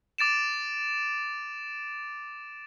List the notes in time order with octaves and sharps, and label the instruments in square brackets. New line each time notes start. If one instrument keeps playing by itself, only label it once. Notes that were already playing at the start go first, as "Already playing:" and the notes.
[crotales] D6 A6 D7 E7